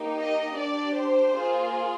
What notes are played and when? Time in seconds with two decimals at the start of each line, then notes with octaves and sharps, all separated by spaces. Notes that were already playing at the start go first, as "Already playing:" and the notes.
Already playing: A#3 D#4 G4
0.18 D#5
0.56 D4 G4 D5
0.96 C5
1.35 A#3 F4 G#4